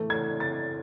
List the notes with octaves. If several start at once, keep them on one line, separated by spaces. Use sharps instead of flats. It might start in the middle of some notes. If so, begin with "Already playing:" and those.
Already playing: A2 E3 A3
G#6
A6